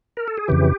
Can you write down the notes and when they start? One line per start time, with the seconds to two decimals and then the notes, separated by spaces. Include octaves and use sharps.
0.17 A#4
0.28 A4
0.37 G#4
0.48 F2 C#3 E3 G4